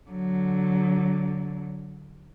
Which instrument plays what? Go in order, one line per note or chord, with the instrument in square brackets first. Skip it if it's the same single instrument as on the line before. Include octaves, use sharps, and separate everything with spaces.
[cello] D3 F#3